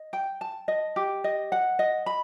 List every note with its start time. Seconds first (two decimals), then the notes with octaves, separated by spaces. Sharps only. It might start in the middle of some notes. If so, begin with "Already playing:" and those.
Already playing: D#5
0.13 G5
0.41 A5
0.68 D#5
0.96 G4
1.24 D#5
1.52 F#5
1.79 D#5
2.06 B5